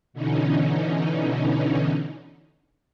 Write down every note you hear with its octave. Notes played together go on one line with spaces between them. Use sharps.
B2 D3 E3 C#4 D#4